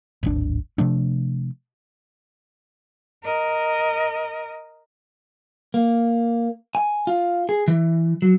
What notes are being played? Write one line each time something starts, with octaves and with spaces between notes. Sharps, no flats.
D1 G#1 D4
C3 F3 A3 D4
A#4 D#5
A#3
G#5
F4
G#4
E3
F#3